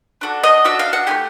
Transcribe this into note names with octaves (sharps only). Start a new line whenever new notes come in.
D4 F#4 A4
D#5
D4 F#4 A4 E5
F5
F#5
A3 D4 G4 G#5